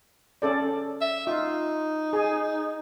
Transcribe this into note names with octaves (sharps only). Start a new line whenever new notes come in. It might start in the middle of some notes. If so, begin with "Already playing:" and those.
C#4 A4 D5
E5
D#4 F4
G#4 G#5